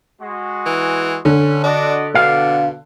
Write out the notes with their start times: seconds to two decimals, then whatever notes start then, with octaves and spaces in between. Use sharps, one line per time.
0.20 G#3 F#4
0.66 E3
1.25 D3 C#4
1.64 D4 F#4 D5 D#5
2.15 B2 D5 F5 F#5